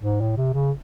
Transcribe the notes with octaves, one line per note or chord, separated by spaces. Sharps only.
G#2
A2
C3
C#3